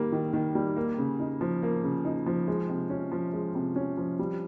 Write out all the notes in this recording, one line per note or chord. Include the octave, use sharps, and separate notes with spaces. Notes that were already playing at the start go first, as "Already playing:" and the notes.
Already playing: D#3 G3 A#3
D#3
D#3
G3
A#3
C#3
D#4
F3
A#3
C#3
D#4
F3
G#3
C3
C#4
F3
G#3
C3
C#4
F3
G3